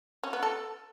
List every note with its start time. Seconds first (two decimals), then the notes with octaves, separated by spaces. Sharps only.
0.23 C#4
0.33 B3
0.43 A4